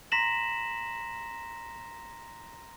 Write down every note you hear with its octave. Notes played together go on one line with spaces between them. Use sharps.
A#5 C6 A#6 B6 E7 F#7